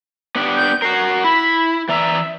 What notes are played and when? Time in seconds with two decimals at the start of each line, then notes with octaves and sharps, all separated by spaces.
0.35 B3 D4 G4
0.56 G6
0.82 F#4 A#4 C7
1.24 E4 B5
1.88 E3 D5 E5 A#5